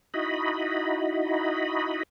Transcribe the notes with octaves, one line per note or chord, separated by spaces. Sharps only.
D#4 E4 F#4 D#5 B5